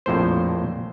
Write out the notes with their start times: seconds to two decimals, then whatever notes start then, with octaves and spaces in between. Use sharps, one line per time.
0.06 A#1 F2 A2 C5